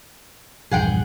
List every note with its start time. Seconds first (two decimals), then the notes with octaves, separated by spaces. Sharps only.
0.71 A#1 E2 G2 G#4 F#5 G5